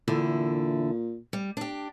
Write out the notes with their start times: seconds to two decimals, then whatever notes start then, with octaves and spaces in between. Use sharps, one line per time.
0.08 E2 A#2 D3 E4
1.33 G3
1.57 D4 G4